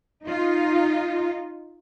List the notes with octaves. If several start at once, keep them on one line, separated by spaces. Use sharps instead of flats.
D#4 F4